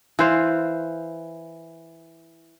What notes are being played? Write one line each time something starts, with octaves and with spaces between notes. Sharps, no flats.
E3 C5 F5